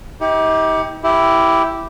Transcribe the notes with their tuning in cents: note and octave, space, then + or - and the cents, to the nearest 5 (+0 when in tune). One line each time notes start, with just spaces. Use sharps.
D#4 +45 G4 +0
E4 +5 G4 -5